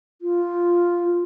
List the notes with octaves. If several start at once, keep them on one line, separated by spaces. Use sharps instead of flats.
F4